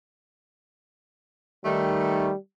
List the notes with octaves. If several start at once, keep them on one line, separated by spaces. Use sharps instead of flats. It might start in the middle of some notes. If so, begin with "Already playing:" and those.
D#3 G3 A3